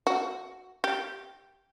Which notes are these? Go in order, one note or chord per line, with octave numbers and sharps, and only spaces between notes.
F#4
G4